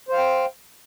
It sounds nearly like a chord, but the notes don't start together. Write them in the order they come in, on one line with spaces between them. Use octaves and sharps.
C5 F5 G5